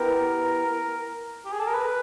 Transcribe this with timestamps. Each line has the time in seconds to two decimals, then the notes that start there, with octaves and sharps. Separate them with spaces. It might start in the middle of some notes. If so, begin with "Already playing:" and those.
Already playing: B3 E4 G4 A#4
1.45 G4
1.52 G#4
1.59 A4
1.67 A#4
1.74 B4